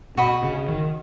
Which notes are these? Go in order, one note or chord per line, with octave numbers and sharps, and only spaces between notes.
B2 F#4 D#5 B5
C#3
D#3